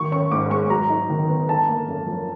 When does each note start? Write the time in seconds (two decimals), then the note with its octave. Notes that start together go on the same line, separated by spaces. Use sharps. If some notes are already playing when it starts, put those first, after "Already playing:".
Already playing: D#3 F#3 C#6
0.12 C#4 C#6
0.31 G#2 D6
0.50 G#3 C#6
0.70 F#3 A#5
0.90 D#4
1.10 D#3
1.29 B3
1.48 D3 A5
1.68 A#3
1.88 F#2
2.07 F3